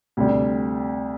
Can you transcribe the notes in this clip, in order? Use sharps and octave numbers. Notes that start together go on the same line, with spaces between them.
D2 C3 G3